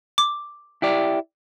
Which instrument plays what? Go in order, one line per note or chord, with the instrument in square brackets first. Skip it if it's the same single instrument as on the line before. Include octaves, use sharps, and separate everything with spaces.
[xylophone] D6
[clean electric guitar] E4 G4 D5